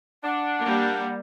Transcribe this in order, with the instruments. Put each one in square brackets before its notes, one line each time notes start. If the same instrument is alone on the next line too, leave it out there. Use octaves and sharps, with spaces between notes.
[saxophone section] D4 [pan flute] F#5
[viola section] G3 A#3